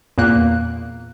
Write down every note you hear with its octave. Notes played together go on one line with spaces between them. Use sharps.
E2 A#2 A#3 F#6